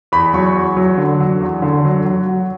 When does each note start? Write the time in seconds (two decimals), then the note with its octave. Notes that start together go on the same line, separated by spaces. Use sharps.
0.12 E2 B5
0.34 F#3 C#6
0.56 E2
0.77 F#3
0.98 D3
1.20 F#3
1.41 E2
1.62 D3
1.85 F#3
2.06 F#3
2.27 F#3